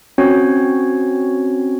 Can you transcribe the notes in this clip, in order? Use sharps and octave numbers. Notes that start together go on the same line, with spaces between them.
C4 C#4 F#4 C#5